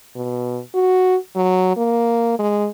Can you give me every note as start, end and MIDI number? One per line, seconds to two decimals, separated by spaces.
0.16 0.60 47
0.75 1.16 66
1.36 1.72 54
1.77 2.37 58
2.39 2.69 56